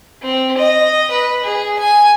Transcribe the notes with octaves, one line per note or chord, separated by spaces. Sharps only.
C4
D#5
B4
G#4
G#5